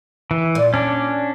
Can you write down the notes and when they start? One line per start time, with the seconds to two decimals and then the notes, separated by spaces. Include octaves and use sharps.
0.31 E3
0.55 A#2
0.74 C#4 D4